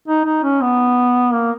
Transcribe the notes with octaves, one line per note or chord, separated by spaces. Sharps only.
D#4
D#4
C#4
B3
A#3